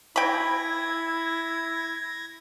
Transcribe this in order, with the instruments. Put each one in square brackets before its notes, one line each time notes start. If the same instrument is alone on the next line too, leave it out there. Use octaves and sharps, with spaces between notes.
[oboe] E4 [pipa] G5 B5 [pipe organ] G#6 A#6